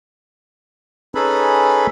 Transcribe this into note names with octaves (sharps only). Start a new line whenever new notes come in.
C#4 D#4 G#4 A4 B4 B5